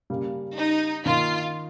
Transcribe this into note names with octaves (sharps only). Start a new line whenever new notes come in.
C#3 G3 A#3
D#4
D#3 A#3 D#4 F4